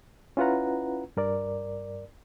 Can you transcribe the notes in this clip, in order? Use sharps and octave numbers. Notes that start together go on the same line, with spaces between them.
C#4 E4 F4 B4 F#5 A#5
G2 A#4 D5